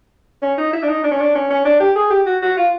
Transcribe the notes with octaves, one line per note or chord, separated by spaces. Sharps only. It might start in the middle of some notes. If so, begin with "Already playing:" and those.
C#4
D#4
E4
D4
D#4
D4
C#4
D4
C#4
C#4
D4
G4
G#4
G4
F#4
F#4
F4